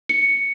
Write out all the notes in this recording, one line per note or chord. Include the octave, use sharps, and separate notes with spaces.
C#7